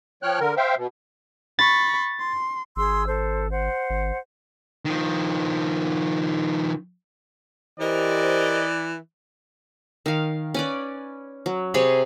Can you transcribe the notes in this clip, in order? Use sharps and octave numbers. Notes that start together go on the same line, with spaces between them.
F3 C#5 G5 F6 F#6
D3 A#4
C5 E5 F5 G5
B2
B5 C#6 A6
C6
G#1 G#4 C6 E6
A4 C5
C5 F#5
G#1
D#3 F3
E3 G4 A#4 C5 D5 D#5
D#3 F5
C#4 B4 D5
F#3
C3 G#4 C#5 B5